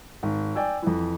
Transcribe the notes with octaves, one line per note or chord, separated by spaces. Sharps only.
G#1
D5 G5 G#5 E6
F2 E3